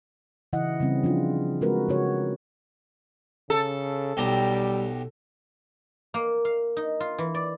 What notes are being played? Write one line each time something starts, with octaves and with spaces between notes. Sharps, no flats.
C#3 E3 E4 D#5 F#5
C#3 G3 C4 C#4
F3 D4 F4
G#3 C4 F#4 A#4 B4
C#3 F#4 C#5
C#3 A4
B1 G3 G4 A#5
A#3
F5
D#4
F4
E3
D5